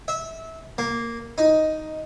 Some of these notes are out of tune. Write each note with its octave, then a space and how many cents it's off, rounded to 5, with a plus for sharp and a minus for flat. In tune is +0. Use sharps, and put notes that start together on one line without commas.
E5 -20
A#3 -5
D#4 +5